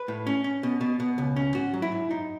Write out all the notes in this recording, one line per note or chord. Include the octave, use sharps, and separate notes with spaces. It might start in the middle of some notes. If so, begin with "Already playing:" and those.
Already playing: B4
A2
C#4
C#4
B2
B2
B2
C#2
C#4
G#2 F#4
F#3
E4
G#2
F#2 D#4